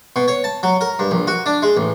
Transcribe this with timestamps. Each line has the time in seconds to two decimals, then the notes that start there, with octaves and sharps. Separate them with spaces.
0.16 B2
0.28 C#5
0.44 A5
0.63 F#3
0.81 A#4
0.99 G2
1.11 A#1
1.27 F#4
1.46 D4
1.62 G#3
1.77 A1